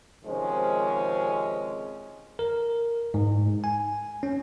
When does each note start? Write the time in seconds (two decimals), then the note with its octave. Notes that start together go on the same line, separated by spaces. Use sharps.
0.25 C3 D#3 F3 G#3 C4 C#4
2.39 A#4
3.14 G#2
3.64 G#5
4.23 C#4